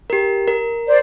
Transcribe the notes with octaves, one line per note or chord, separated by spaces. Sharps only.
G4 A#4
A#4
C5 D5